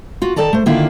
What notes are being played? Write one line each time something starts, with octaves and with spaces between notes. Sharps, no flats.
F4 F#4
D#3 A4 D5 A5 A#5
A3 C5
D3 D#3 A#3 D4 E4 F4